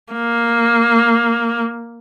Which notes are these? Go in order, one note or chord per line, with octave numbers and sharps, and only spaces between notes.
A#3